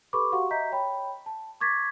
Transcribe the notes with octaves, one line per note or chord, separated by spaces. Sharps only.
G4 A4 B4 B5 C#6 D6
F#4 G4 F5 F#5 C6 C#6
D#5 E5 A#5 G6 B6
C#5 G5 B5
A5
C#6 D6 G#6 A6 B6